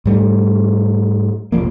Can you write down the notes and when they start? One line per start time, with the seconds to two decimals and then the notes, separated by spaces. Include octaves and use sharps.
0.05 G#2 G3 A3
1.52 F1 A#1 F3 A#3